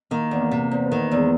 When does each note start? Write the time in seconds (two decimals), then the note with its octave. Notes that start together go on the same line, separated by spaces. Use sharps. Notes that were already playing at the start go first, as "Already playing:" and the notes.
0.11 D#3 A#3
0.31 E2
0.41 A#3
0.51 C3
0.71 E2 C4
0.86 B3
0.92 D#3
1.11 E2
1.17 G#3